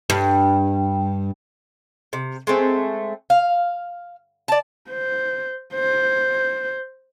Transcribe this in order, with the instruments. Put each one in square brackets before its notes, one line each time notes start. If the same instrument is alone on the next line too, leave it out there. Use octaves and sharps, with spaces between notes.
[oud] G2
[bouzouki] C3
G#3 A3 C4
F5
D5 A5
[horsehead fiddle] C5
C5